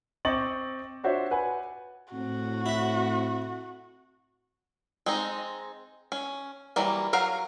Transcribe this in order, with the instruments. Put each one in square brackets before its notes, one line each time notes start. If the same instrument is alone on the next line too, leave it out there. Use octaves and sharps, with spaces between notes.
[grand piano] C4 D#5 C#6 D6 A6 F#7
D4 F4 F#4 C5 C#5 E5
B4 F#5 G#5
[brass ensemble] A2 [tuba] C4 [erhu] F#4
[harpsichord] E4 E5
[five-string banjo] G#3 C4 D#4
C#4
E3 F#3 G3 A#3
F#3 A#4 F5 F#5